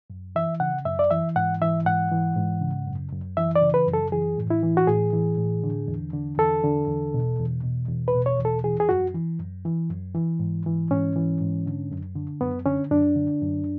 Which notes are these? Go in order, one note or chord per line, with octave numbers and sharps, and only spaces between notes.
F#2
E3 E5
C#3 F#5
F#2 E5
D5
E3 E5
G#2 F#5
E3 E5
G#2 F#5
E3
G#2
C#3
F#2
F#2
E3 E5
D5
C#3
B4
F#2
A4
E3 G#4
A2
E4
E3
F#4
A2 G#4
E3
A2
D3
E2
D3
E2 A4
D3
E2
B2
E2
B2
E2
B4
B2
C#5
E2
A4
E3 G#4
G#4
F#2 F#4
E3
F#2
E3
F#2
E3
G#2
E3
G#2 C#4
E3
G#2
D3
F#2
D3
F#2 B3
D3 C#4
F#2 D4
D3
F#2